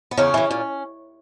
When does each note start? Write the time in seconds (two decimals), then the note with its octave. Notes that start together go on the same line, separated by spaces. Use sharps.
0.11 B3
0.17 E2 C#3 C#4
0.34 C#3 E3
0.51 A#2